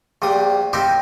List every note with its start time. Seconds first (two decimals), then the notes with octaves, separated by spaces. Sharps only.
0.22 A#1 A#2 G3 D#6
0.73 G3 A#3 C4 D#4 E4 G4